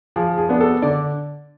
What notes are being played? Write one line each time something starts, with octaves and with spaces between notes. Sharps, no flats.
F3 G#4
G#4
B3 D4
A4
D3 D5